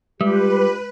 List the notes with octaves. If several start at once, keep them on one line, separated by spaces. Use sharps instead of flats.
G2 G3 G#3 F4 G4 B4